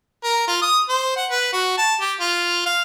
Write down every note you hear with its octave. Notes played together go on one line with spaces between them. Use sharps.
A#4
F4
D#6
C5
F#5
B4
F#4
A5
G4
F4
F5